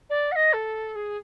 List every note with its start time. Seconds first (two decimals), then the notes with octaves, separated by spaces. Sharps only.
0.09 D5
0.31 F#5
0.35 D#5
0.52 A4
0.95 G#4